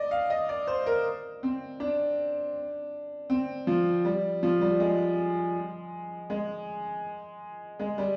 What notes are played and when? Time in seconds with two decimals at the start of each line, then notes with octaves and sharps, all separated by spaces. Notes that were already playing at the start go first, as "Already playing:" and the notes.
Already playing: D5 D#5
0.11 F5
0.30 D#5
0.49 D5
0.67 C5
0.86 A#4
1.43 C4
1.80 D4
3.30 C4
3.67 F3
4.05 G3
4.43 F3
4.61 G3
4.80 G#3
6.30 G#3
7.79 G#3
7.98 G3